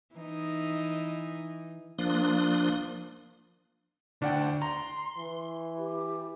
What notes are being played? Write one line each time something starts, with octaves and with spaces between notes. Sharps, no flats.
E3 D#4
F3 A#3 D4 C6 D#6 F#6
D2 D4 F#5 G5
A#5 C6
E3
G4